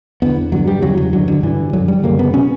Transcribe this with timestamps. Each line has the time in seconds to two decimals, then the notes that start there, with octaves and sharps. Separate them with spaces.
0.22 E2 D3 B3
0.52 G2 D3 F#3
0.67 G3
0.82 E2 C#3 F#3
0.98 F#3
1.13 G2 D3 F#3
1.28 D3
1.43 G2 D3 E3
1.73 F#2 D3 F#3
1.88 G3
2.03 F#2 C#3 A#3
2.19 B3
2.34 B2 C#4